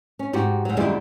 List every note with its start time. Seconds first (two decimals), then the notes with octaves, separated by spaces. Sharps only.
0.19 C#4
0.33 G#2 F#4 G4
0.65 G#2 F#3
0.77 F#2 A#2 D#3 G3 G#3 E4